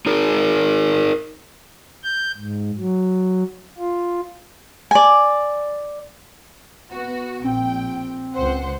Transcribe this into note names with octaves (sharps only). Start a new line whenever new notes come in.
D#4 G#4 A#4
G6
G#2
F#3
F4
D5 G#5
B3 F#4
A#1 C4 G5
C#2 C5 F#5